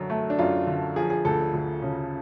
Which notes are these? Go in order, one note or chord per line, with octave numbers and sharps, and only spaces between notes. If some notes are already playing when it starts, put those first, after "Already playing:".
Already playing: F#2 D3 F#3
A3
D4
F#2 F4
D3
F3 G#4
G#4
D2 A4
D2
C#3